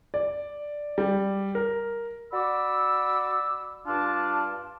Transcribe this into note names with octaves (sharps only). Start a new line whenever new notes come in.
D5
G3
A#4
F#4 D5 B5 D6 E6
G2 D4 F4 D5 A5